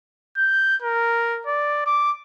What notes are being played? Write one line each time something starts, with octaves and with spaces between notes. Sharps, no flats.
G6
A#4
D5
D6